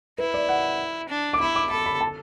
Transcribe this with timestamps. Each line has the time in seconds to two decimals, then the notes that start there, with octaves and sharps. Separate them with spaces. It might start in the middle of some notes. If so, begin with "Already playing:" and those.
0.18 E4 B4
0.34 D5
0.49 F#5
1.09 D4
1.33 D6
1.40 E4 B5
1.55 D6
1.70 A4 B5
1.86 B5
2.01 A5